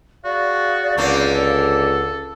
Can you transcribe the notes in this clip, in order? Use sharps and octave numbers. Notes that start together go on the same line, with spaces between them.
F#4 G#4 D5 F5
C#2 D3 A#3 C4
A4